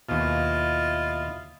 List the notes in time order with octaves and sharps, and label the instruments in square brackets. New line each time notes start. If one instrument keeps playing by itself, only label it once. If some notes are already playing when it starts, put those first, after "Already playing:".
[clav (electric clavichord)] D#2 B2 [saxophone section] E4 F4 D#5